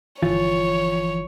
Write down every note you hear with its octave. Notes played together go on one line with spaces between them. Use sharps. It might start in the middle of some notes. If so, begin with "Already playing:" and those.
G1 E3 F3 F4 C#5